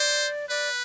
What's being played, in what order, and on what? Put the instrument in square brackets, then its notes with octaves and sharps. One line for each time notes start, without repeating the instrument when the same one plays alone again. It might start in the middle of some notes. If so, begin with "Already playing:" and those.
Already playing: [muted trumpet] C5 [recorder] D5
[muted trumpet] B4 [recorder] D5